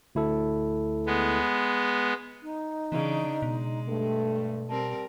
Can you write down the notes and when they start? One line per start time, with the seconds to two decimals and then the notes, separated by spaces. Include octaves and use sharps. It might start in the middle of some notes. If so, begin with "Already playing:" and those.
0.15 D2 E4 A4
1.06 G#3 B3
2.43 D#4
2.92 C#3 E3 D4
3.42 B2 G#3
3.87 G2 A3
4.70 G3 C4 A#4 A5